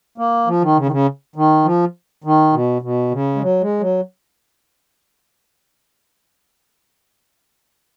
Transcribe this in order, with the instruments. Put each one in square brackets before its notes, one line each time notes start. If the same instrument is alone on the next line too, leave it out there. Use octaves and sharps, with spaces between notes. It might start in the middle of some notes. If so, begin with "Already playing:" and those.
[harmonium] A#3
F3
D#3
C#3
D#3
C#3
D#3
F3
D#3
B2
B2
C#3
G#3
F#3
G#3
F#3